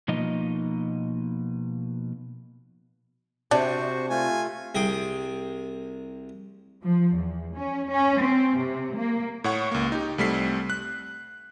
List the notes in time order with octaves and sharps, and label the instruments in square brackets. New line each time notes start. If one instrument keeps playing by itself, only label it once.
[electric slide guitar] B2 F3 A#3 D#4 D#5
[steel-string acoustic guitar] C3 [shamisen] D4 [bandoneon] F#4 C5 C#6
[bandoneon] A3 F4 [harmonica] G#5
[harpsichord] C2 G#4 G5 D#6
[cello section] F3
E2
C#4
C#4
C4
C3
A#3
[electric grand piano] A2 C#5 F#5 C#6
C#2 A#3
D#4 G4
C2 G3 A3 C4 B6 C7
F#6